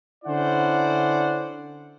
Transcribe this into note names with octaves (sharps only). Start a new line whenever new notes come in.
D3 C#4 E4 C5 D5 F#5